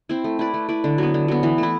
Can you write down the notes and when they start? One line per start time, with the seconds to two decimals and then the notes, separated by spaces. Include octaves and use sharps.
0.09 C4 E4
0.24 A3
0.39 E4 B4 D5
0.54 A3
0.69 E4 B4 D5
0.84 D3
0.98 F#3 B3
1.14 D3
1.28 F#3 B3
1.43 E3
1.58 A3 E4